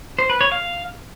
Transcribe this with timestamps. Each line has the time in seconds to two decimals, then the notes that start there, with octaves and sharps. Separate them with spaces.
0.19 C5
0.30 B4
0.41 C#5
0.52 F5